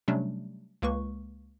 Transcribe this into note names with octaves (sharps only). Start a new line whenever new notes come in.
C3 F#3 G3 A3 C#4 D4
C#2 A#3 B4 C#6